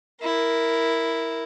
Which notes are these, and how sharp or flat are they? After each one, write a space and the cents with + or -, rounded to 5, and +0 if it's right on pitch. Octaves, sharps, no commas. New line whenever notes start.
E4 +0 A#4 +0